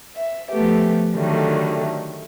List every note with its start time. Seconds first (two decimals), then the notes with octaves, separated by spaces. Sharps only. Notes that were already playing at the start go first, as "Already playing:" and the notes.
0.16 E5
0.51 F3 A3 B3 G4
1.14 D3 D#3 F#3 G3 A3